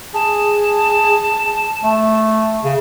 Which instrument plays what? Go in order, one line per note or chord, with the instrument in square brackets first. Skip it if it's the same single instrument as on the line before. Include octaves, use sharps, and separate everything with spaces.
[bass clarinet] G#4 [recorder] A5
[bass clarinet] A3
C#3